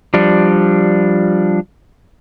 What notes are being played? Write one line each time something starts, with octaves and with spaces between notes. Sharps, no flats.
F3 G3 D4